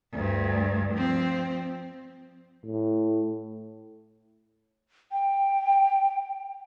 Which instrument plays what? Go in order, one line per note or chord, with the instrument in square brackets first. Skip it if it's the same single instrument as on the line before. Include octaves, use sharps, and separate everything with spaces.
[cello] D2 G2
F3 C4
[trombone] A2
[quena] G5